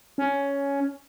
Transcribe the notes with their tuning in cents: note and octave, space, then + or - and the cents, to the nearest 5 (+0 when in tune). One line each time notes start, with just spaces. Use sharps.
C#4 +10